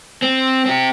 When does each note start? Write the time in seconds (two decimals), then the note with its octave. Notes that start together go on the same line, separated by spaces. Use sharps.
0.22 C4
0.66 C4 G4